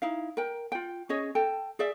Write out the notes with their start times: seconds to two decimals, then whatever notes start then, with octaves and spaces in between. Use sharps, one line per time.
0.02 D#4 E4 F5
0.37 A#4 G5
0.72 F4 G5
1.09 C#4 G#4 C#5 D#5
1.35 A4 G5 A5
1.79 G#4 D5 E5